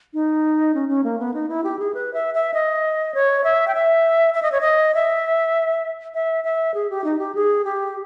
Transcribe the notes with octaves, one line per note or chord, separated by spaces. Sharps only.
D#4
C#4
C#4
A#3
B3
D#4
E4
G4
G#4
B4
E5
E5
D#5
C#5
E5
G5
E5
E5
D#5
C#5
D#5
E5
E5
E5
G#4
G4
D#4
G4
G#4
G4